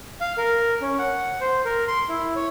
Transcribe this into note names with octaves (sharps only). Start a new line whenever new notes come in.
F5
A#4
C#4
F#5
C5
A#4
C6
E4
C#5